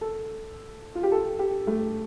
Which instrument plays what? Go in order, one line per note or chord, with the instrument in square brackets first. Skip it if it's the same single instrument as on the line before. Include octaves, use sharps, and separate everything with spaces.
[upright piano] A4
F4
G4
A4
G4
A3